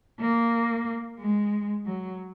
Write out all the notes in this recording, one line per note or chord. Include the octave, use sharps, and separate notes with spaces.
A#3
G#3
F#3